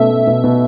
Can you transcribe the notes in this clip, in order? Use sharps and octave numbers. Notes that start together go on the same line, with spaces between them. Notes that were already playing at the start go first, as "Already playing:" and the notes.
Already playing: B2 A3 C#4 E5
A3
B2
B2